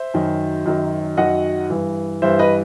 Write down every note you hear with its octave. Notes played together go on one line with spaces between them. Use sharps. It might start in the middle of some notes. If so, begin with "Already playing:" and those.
Already playing: C5 E5
F#2 D#3 F#3
F#2 D#3 F#3
F#2 D#3 F#3 D#5 F#5
G2 E3
G2 E3 C5 E5
B4 D#5